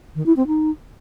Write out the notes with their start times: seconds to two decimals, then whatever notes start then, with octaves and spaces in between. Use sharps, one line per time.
0.15 D#3
0.26 E4
0.37 C4
0.47 D#4